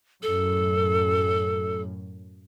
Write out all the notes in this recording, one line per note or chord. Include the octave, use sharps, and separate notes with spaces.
F#2 A2 A4